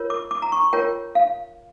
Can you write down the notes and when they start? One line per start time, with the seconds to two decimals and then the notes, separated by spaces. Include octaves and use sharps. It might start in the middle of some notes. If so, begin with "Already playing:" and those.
Already playing: F4 A#4 C#5
0.10 D6
0.31 D6
0.42 A#5
0.52 C#6
0.73 F4 A#4 C#5 G5
1.15 F5